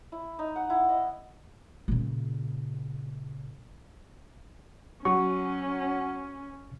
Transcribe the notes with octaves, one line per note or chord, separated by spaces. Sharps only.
E4
D#4
F#5
E4
D#5
A#2 C#3
F#3 C#4 C#6